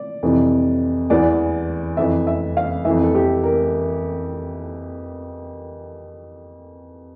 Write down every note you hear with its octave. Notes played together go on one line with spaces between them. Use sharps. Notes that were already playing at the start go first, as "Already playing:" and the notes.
Already playing: D5
F2 C3 E3
E2 E3 D5
F2 E3 E5
E5
F5
F2 E3 E5
A4
G4
A#4